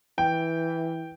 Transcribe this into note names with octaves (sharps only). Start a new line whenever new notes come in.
E3 G5